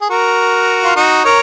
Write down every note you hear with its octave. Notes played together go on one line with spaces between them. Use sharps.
G#4
F#4 A#4
F4
D#4 F#4
A#4 C#5